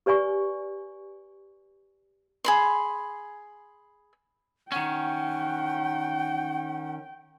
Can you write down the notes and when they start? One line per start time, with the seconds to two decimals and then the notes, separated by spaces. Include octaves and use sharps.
0.06 G4 B4 D5 G#5 C#6
2.45 G#4 B5 C6
4.72 D#3 C#4 F#5 G5